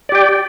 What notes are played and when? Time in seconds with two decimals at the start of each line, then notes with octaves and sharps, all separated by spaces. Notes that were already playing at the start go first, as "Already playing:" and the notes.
0.09 D5
0.12 G4
0.15 G5